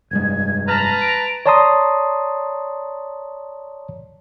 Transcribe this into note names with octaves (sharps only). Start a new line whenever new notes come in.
F1 G2 G#3 G#6
B4 A5 A#5 F6
D7
C#5 D5 A5 A#5 C6 D#6